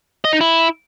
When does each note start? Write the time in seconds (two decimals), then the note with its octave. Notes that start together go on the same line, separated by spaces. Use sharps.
0.25 D#5
0.33 D#4
0.41 E4